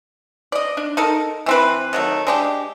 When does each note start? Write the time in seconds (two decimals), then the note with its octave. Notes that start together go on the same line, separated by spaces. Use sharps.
0.52 D5 D#5
0.77 D4
0.97 D#4 A4 A#4
1.46 E3 C4 B4
1.93 D#3 F#3 A3
2.27 G#3 D4 G4